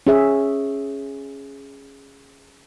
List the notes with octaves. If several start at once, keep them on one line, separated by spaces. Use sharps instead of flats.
C#4 G#4 E5